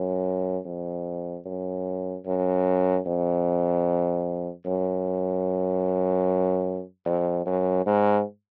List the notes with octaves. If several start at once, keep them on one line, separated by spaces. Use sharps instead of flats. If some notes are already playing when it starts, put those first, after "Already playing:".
Already playing: F#2
F2
F#2
F#2
F2
F#2
F2
F#2
G#2